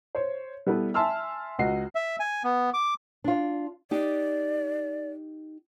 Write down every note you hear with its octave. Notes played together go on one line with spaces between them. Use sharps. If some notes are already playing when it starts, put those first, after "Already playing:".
C5 C#5
G3 B3 E4 A4 B4
E5 G#5 A5 C6 E6 F6
C#2 F#4 D#5 C7
E5
G#5
B3
D6
D4 F4
D#4 G4 D5